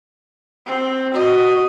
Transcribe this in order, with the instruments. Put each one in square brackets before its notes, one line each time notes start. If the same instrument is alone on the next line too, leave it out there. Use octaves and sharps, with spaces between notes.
[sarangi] C4
[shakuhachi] F#4 [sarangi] D#5